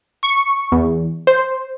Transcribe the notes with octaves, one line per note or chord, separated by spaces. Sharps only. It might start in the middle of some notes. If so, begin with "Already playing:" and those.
C#6
E2
C5